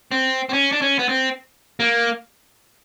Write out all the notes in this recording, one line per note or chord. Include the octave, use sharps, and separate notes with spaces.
C4
C4
C#4
D4
C#4
B3
C4
A#3